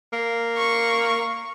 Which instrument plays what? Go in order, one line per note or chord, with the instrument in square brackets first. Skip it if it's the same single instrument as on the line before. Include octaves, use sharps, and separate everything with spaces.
[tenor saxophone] A#3
[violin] C#6